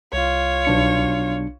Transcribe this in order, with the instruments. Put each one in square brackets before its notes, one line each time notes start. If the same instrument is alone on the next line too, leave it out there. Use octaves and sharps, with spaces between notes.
[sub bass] C2 [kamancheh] F4 C#5
[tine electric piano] B1 D4 C#7